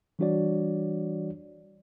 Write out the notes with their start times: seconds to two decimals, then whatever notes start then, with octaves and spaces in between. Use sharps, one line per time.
0.19 E3 G3 D4 F#4 C#5 D5